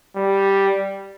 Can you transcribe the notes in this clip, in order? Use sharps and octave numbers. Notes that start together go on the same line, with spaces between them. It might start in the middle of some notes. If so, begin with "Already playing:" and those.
G3